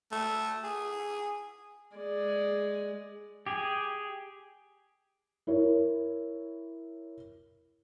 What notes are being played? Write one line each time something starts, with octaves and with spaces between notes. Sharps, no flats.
A3
G#4
G#3 D5
G4 G#4
E4 A#4 C#5